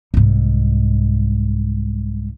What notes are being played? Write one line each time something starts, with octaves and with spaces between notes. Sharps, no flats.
C2 G#2